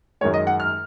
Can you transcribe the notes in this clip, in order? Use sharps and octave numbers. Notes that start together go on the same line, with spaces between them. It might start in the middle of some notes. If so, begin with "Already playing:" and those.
F#2 D#3 G#3 C#5
D#5
F#5
F6